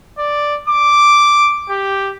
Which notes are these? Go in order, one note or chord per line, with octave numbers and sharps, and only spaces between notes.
D5
D6
G4